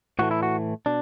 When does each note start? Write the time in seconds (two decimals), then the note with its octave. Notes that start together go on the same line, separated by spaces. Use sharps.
0.19 A2 E3 A3 F#4
0.31 E4
0.43 F#4
0.86 B2 D4